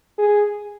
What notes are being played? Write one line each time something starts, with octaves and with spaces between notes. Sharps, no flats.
G#4